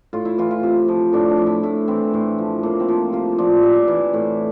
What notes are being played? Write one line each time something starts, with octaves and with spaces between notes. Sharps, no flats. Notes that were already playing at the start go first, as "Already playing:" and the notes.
A2 F4
E4
E3 F4
F4
C3 E4
F3
A2 D4
D4
F3
E4
A2 E4
E3 C4
A2
F3
A2 A#3
C4
F3
C3 F4
F3 D5
C3 E5
E3
A2